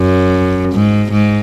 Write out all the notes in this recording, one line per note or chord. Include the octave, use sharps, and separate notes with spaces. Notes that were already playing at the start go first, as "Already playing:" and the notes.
Already playing: F#2
G#2
G#2